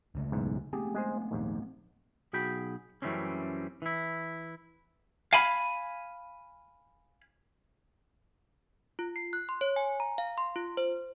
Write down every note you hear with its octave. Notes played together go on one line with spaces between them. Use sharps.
C#2 C#3 A3
B1 E2 G#2
A3 B3 C4 G4 G#4
G#3 G#4 C5
A#1 D#2 G#2
B1 F#4 G#4 G5 B5
F#2 E3 G3 A3 C4 C#4
E3 E4
F5 G#5 B5
F4
C7
F#6
C6
C#5
G#5
A#5
F5
C6
F4
C5